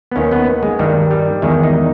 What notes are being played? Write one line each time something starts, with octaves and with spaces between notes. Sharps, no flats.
B3
D#2 D#3 C#4
B3
G#3
G2 D#3 G3
G3
E2 D#3 G#3
D#4